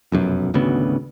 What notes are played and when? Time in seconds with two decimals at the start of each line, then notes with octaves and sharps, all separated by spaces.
0.12 F1 B1 F#2
0.54 G#1 D2 C#3 B3